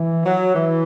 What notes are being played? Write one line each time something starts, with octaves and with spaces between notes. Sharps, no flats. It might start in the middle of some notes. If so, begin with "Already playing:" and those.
Already playing: E3
F#3
E3